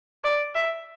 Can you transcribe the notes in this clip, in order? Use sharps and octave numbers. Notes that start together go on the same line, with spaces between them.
D5
E5